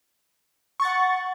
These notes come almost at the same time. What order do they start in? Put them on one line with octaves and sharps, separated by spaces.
C#6 A6 F#5